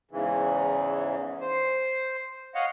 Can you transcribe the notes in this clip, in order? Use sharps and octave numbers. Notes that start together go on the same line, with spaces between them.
E2 G#2 C#3 E3
C5
C#5 D#5 F5 F#5